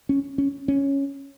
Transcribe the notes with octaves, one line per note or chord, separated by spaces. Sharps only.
C#4
C#4
C#4